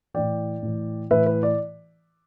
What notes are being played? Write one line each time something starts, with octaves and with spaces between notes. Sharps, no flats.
A2 E3 D5 G5
A2 E3
A2 E3 B4 E5
B4
D5